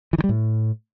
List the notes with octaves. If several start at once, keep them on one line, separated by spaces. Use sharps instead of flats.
E3
D#3
G3
A2